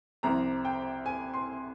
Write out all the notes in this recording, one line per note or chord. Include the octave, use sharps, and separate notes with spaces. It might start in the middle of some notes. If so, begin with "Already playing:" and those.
C2 C3 F3 A#5
G5
G#5
C6